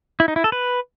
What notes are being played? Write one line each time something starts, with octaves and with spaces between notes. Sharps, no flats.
E4
D#4
E4
A4
B4